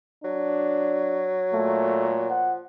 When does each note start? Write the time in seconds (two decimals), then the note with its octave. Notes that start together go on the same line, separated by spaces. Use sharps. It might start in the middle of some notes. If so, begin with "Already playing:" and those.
0.24 F#3 D4
1.53 A#2 A3
2.30 F3 F#5